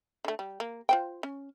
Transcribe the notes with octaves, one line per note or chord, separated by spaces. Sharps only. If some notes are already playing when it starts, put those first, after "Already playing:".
D3 A3
G3
A#3
F4 C5 G5
C#4